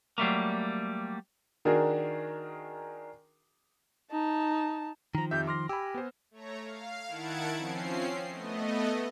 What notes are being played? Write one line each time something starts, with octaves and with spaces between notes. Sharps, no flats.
F#3 G3 A3 A#3
D#3 D4 F#4 G#4 A#4
D#4 A5
D#3 F3 A#5
F2 G4 E5 G6
C6 D6 F6 A#6
G4 G#5 B5 E6
B3 C5
A3 C#5 A#5
F5
D#3 E4 F#5 A5 G#6 D7
F3 C4 C#4 C7
A3 B3 D#5